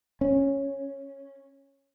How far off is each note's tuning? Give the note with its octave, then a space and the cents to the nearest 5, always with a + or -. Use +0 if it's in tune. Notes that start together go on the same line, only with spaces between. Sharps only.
C#4 -5